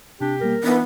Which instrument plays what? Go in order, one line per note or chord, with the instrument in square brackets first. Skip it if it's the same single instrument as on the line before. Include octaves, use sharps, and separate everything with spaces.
[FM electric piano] C3 [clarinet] D4 [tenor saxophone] G4
[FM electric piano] B2 G3 A#3 [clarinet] A#4
[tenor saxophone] E3 [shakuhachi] B3 [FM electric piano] D4 D#4 B4